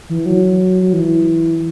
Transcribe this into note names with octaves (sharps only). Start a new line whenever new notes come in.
E3
F#3
F#3
E3